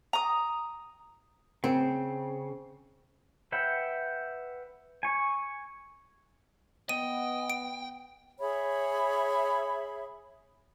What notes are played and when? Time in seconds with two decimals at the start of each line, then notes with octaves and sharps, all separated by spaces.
0.13 A#5 D#6
1.64 C#3 C4
3.52 B4 E5 F#5 G5
5.03 G#5 C#6
6.89 B3 D#5 G5 D#7
7.50 D7
8.40 G#4 C#5 E5 B5